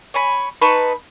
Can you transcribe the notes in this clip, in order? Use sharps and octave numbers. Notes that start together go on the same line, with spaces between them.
C#5 G#5 B5
D#4 B4 A5 C#6